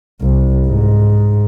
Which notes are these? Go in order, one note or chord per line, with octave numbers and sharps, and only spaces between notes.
C2
G#2